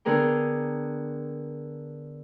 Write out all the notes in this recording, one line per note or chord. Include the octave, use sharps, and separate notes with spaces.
D3 B3 G#4 A#4 G5